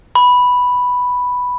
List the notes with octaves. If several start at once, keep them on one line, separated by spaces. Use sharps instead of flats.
B5